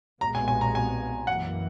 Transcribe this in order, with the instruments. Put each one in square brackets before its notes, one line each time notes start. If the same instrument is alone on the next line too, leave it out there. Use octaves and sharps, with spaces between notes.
[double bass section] B1 A#2 G#3 B3 [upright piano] A#5
[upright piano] G#5
G#5
A#5
G#5
[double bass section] F#2 E3 A#3 [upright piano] F#5